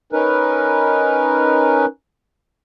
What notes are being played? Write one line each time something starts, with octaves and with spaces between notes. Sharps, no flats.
C#4 D#4 A#4 B4